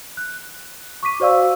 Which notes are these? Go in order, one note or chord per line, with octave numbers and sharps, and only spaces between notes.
F#6
C#6 D6 B6 D#7
F#4 C5 D5 F5 E6